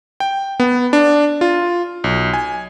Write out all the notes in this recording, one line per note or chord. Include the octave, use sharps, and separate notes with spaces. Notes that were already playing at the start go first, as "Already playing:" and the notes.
G5
B3
D4
F4
B1
G#5